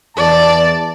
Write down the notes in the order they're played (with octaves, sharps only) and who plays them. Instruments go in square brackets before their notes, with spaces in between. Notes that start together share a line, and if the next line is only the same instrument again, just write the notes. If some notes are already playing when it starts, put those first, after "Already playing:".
[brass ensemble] E2 A5 [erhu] D5